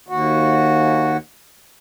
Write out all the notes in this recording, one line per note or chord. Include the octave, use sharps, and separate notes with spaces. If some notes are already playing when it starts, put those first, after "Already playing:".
D#2 F#4